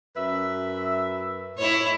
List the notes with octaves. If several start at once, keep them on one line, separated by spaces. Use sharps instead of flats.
F#2 B4 E5
A2 E4 C#5